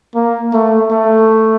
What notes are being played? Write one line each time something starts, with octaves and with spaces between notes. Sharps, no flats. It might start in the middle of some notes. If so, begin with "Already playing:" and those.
A#3
A3
A3